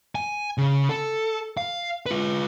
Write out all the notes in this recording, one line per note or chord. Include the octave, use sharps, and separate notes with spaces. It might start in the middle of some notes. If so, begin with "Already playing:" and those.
G#5
C#3
A4
F5
F4 B4